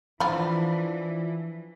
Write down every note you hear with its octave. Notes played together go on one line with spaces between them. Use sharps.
D3 E3 F3 D4 F4 B5